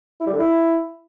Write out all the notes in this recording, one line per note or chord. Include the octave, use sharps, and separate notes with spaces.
E4
G3
D3
E4